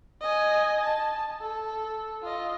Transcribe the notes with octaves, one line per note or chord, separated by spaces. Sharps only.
D#5 G#5
A5
A4
F4 D#5